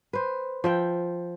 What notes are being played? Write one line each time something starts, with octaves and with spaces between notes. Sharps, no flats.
B4 C5
F3 E5 G5